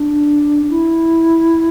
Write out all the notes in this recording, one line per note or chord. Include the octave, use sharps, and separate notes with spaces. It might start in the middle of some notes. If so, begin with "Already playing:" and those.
Already playing: D4
E4